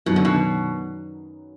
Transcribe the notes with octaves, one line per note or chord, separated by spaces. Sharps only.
F#2 B2 D#3 F#3 B3
D3
B2